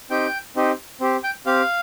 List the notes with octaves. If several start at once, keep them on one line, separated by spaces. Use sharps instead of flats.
C4 D#4 G4 G5
C4 D#4 G4
C4 G4
G5
C4 G4 F5